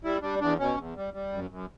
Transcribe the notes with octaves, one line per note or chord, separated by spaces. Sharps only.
G3 E4
G3 D4
E2 D4
B2 C#4
E2
G3
G3
F#2
F#2